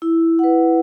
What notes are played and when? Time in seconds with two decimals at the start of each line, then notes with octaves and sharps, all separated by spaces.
0.02 E4
0.39 B4 F#5